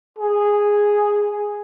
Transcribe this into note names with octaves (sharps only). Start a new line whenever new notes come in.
G#4